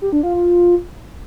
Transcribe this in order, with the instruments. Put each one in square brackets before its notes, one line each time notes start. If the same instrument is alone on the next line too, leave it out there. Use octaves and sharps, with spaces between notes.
[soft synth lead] G4
D4
F4
F4